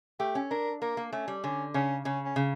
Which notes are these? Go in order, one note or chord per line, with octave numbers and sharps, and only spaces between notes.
A3 G4
C#4
D4 A#4
A#3 A#4
A#3
A3 C#4
G3
D3 C#4
C#3 C#4
C#3 C#4
C#4
C#3